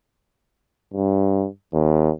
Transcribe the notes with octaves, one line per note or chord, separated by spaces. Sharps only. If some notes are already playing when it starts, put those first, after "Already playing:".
G2
D#2